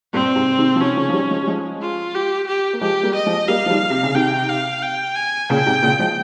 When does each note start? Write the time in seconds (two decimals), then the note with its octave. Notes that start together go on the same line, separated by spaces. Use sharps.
0.13 G2 A#2 C4
0.36 G#2 C3
0.58 C3 D#3
0.76 F3
0.80 C3 D#3 C#4
0.97 C#3 F3
1.09 F3
1.13 D#3 G3
1.30 F3 G#3
1.43 G3
1.47 F3 G#3
1.81 F4
2.15 G4
2.48 G4
2.73 A#3
2.81 F3 G#3 G4
3.03 G3 A#3
3.15 D#5
3.26 F3 G#3
3.48 G3 A#3 F5
3.66 F3
3.70 D#3 G3
3.90 C3
4.03 C#3
4.15 C3 D#3 G5
4.48 F5
4.83 G5
5.15 G#5
5.49 A#2 C#3 G5
5.66 G#2 C3
5.82 A#2 C#3
5.99 F3 G#3